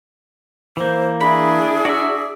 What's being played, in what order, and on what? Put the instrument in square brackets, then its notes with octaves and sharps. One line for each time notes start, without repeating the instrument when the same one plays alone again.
[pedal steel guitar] E3 A#3 [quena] C5
[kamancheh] D4 E4 [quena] G#4 [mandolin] B5
[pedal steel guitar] F#4 E5 [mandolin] D5